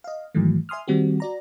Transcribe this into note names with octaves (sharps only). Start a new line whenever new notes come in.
D#5 F5
G#2 D#3 E3 F#3 A3
E5 G#5 C6 D#6 F6
D#3 G3 C4 F#4 G4
F#4 D5 A#5